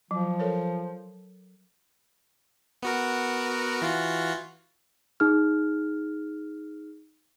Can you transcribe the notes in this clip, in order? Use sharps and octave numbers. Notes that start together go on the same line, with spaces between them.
F3 F#3
A4 A#4 C#5
B3 F#4 A#4
E3 F4 F#4
D#4 G#4 F6